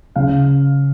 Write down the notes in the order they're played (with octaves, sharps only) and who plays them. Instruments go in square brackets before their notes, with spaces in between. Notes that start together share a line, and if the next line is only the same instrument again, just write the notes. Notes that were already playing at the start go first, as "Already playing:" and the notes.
[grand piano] C#3 F5